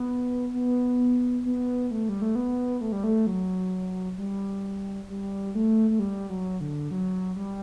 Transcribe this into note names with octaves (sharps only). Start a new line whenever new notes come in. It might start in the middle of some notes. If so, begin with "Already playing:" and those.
Already playing: B3
B3
B3
A3
G3
A3
B3
A3
G3
A3
F#3
G3
G3
A3
A3
G3
F#3
D3
F#3
G3